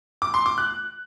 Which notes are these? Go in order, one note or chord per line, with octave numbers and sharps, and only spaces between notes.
D6
C6
D6
F#6